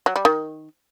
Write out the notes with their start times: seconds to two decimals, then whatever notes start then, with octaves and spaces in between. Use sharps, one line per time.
0.06 F#3
0.16 G3
0.25 D#3